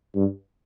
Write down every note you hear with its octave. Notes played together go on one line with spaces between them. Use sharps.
G2